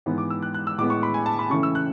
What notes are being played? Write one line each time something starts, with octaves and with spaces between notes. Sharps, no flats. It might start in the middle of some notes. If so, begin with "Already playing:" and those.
G#2 E3 B3
D6
E6
F#6
F#6
E6
A2 G#3 B3 D6
C#6
B5
G#5
A5
B5
C#3 E3 A3 C#6
E6
F#6